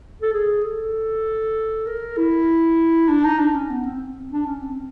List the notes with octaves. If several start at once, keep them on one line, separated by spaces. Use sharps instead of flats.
A4
G#4
A4
A#4
E4
D4
D#4
D4
C#4
B3
C4
D4
C#4
C4